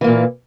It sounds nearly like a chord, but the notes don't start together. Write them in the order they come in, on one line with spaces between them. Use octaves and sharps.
E3 A#3 A#2